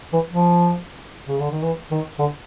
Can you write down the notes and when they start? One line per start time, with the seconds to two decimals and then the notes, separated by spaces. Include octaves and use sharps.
0.13 E3
0.32 F3
1.28 C#3
1.40 D3
1.51 D#3
1.63 E3
1.91 D#3
2.19 D3